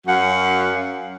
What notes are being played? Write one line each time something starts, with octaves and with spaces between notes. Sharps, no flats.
F#2 C#4 F#4 F5 F#5